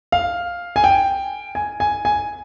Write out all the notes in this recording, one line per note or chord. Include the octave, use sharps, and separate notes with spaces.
F5
G#5
G5
G#5
G#5
G#5